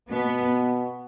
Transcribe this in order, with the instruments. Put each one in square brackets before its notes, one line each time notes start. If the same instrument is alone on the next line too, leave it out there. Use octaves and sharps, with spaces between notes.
[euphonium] B2 [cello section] B3